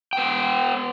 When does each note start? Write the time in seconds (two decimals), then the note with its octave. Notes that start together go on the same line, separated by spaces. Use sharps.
0.13 B3 G5